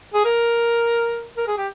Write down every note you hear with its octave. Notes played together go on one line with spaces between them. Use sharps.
G#4
A#4
A#4
G#4
G4